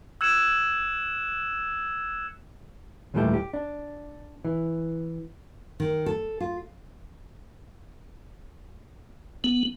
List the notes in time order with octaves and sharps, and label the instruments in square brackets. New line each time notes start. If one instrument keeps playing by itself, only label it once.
[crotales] E6 F#6 G#6 C#7 E7
[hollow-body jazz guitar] D#2 A#2 E3 G3 A3 G4
G4
D4
E3
[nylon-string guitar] D#3
A4
F4
[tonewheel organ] B3